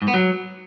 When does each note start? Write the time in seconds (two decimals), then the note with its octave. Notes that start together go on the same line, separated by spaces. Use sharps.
0.02 G#2
0.08 B3
0.14 F#3